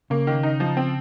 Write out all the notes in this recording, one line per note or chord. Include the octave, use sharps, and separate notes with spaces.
C#3 A#3
D#3
D#4
F3
C4